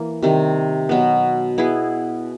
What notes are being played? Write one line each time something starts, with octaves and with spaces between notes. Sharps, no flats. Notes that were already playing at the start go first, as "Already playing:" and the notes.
Already playing: E3 A#3
C3 D#3 G3
B2 F#3 B3
B3 E4 G#4